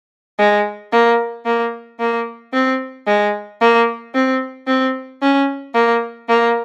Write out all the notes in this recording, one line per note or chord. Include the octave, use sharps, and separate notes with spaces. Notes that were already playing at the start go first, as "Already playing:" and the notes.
G#3
A#3
A#3
A#3
C4
G#3
A#3
C4
C4
C#4
A#3
A#3